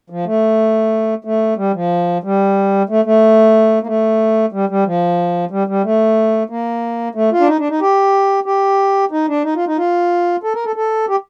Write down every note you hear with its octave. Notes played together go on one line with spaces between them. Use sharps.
F3
A3
A3
G3
F3
G3
A3
A3
A#3
A3
G3
G3
F3
G3
G3
A3
A#3
A3
F4
D4
D#4
D4
D#4
G4
G4
D#4
D4
D#4
F4
D#4
F4
A4
A#4
A4
A4
G4